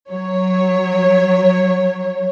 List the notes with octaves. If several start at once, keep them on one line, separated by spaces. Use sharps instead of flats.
F#3 C#5